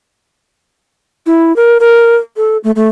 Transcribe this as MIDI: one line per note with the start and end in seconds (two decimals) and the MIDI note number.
1.26 1.55 64
1.56 1.78 70
1.80 2.16 70
2.37 2.57 69
2.64 2.71 57
2.76 2.88 57